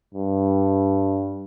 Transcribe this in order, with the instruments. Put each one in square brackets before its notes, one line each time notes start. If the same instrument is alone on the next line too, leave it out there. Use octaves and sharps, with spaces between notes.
[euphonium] G2